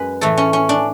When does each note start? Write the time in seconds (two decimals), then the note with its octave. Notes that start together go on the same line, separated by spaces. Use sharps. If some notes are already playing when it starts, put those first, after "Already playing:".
Already playing: F#2 G#3 B4
0.21 A2 E3 A3 A4
0.37 C#4
0.53 C#4
0.69 D4